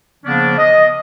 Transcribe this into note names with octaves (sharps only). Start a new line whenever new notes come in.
C#3 F3 A#3 B3 C#4 D4
D#5